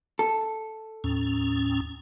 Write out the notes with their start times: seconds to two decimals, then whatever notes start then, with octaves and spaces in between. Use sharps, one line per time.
0.19 A4
1.04 D#2 A2 C#4